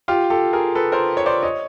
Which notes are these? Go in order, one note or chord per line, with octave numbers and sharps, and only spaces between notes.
F4 G4
G4 A4
G#4 A#4
A4 B4
A#4 C5
C#5
C5 D5
C#5 D#5